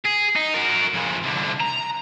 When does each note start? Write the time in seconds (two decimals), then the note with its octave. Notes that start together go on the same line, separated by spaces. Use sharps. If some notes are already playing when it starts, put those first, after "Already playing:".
0.05 G#4
0.35 D#4
0.54 F#4 A#4
0.94 F2 G#3
1.23 C2 D3
1.60 A#5